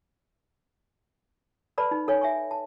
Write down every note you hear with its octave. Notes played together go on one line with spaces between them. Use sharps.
A4 B4 D5 A5 B5
D#4
D#4 A4 C#5 G#5
E5 G#5 C#6
A5